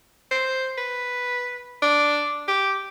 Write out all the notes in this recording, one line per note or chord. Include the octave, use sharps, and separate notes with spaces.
C5
B4
D4
G4